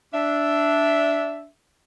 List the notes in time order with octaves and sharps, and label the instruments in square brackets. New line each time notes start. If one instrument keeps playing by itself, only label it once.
[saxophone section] D4 E5